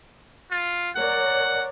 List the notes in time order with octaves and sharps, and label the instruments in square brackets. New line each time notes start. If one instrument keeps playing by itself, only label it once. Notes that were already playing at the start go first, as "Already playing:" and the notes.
[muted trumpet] F4
[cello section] A#4 C#5 D5 [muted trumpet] F#5